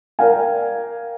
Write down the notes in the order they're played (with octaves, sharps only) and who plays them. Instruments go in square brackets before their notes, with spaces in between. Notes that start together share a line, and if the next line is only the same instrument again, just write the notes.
[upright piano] A#4 D5 F5 G5 G#5